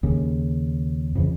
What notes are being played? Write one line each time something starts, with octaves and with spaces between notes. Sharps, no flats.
D#2 C#3
F2 C#3 E3